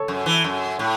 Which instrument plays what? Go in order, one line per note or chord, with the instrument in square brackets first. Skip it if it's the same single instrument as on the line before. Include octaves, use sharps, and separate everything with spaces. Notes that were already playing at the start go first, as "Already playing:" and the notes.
Already playing: [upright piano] A4 C#5
[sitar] F#2
E3
F#2
A2